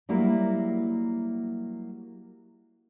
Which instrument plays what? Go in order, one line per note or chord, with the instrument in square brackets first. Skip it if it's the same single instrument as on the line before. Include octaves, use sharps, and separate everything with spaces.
[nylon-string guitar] F#3 G3 A#3 E4